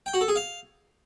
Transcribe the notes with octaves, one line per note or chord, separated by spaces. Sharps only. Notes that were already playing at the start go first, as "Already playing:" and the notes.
G5
F#4
A4
G#4
F5